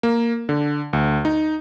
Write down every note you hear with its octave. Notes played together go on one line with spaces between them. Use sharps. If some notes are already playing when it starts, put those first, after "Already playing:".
A#3
D3
D2
D#4